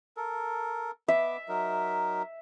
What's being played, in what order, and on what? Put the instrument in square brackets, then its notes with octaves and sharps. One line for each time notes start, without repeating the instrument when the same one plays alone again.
[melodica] A4 A#4
[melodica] B3 D6 [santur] E5
[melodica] F#3 D#4 A#4